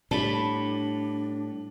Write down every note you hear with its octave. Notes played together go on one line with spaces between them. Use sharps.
A2 G3 D4 A5 B5